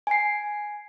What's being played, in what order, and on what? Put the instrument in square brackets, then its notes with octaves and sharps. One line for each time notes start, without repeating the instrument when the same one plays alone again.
[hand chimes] G#5 C7